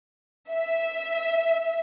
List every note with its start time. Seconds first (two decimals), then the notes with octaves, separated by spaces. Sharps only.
0.50 E5